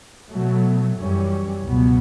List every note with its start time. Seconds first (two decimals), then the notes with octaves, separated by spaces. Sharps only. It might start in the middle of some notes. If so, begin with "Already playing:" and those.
0.32 B2 F#3 A3
0.97 F#2 E3 G3 C#4
1.62 C#2 B2 F#3 B3